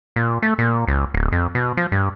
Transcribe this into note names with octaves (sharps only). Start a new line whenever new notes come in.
A#2
A3
A#2
C#2
D1
F2
B2
F3
G2